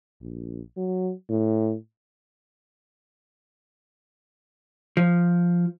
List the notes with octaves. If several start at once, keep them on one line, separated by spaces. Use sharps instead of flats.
A#1
F#3
A2
F3